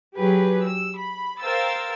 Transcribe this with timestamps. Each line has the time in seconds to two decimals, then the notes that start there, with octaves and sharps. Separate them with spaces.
0.16 F#3 G4 G#4 B4
0.66 E6
0.98 B5
1.40 A#4 C5 F5 G5 E6 A6